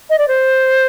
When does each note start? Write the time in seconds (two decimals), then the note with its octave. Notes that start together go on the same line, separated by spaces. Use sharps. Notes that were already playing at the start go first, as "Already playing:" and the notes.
0.10 D#5
0.19 D5
0.28 C5